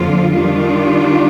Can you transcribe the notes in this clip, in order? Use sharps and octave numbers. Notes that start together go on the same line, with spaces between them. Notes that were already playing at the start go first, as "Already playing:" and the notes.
Already playing: F2 D3 F3 A#3 F4
D#3 G3 D4 F4